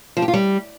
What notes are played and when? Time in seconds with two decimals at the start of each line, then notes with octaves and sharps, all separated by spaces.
0.17 F3
0.22 G4
0.28 F4
0.34 G3